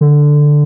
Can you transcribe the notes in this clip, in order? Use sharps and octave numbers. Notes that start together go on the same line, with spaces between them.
D3